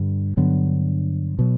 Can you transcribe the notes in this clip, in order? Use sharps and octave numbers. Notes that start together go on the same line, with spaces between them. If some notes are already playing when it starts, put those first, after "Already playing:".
Already playing: G2 D3 G3
G2 D3 F#3 B3
B2 F#3